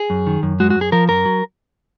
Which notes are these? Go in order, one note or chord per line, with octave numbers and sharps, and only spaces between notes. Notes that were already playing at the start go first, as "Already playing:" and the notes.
Already playing: G#4
F#2
D#3
F#2
G#3 F#4
F#4
F#2
G#4
F3 A#4
F#2 A#4
F#3